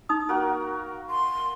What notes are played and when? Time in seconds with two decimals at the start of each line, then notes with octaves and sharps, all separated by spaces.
0.09 D#4 D#6
0.29 A#3 F#4 A#4
1.10 C6